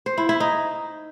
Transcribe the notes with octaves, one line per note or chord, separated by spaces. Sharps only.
C5
E4
E4
D#4